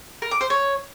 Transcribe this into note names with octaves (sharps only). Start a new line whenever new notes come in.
A#4
D6
C5
C#5